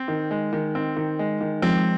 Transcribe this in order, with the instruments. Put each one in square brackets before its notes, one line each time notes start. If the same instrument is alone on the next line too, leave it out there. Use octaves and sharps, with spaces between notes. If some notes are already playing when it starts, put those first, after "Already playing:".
Already playing: [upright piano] C4
D#3
G#3
D#3
C4
D#3
G#3
D#3
[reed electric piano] F3 G#3 [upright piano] C4